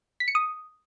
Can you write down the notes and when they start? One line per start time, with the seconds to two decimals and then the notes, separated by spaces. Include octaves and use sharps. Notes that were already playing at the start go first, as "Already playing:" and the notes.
0.20 B6
0.28 C#7
0.35 D#6